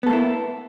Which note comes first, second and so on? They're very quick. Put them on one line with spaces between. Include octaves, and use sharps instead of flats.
B3 A4 A#3 E4